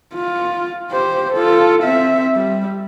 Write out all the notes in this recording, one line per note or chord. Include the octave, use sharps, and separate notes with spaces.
F4
G4 C5
F4 A4
C4 E5
G3